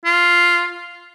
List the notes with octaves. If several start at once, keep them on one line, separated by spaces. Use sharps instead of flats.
F4